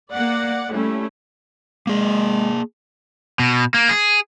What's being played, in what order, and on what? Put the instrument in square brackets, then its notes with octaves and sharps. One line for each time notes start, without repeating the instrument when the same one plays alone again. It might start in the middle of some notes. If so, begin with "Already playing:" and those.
[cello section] A#3 [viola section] D5 F#5
[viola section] G3 A3 [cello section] C#4 E4
[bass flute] G#3 [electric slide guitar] A#3 G#4
[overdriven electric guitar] B2
A#3
G#4